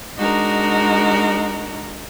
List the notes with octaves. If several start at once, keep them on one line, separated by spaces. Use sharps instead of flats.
G#3 D4 D#4 F#4 A#4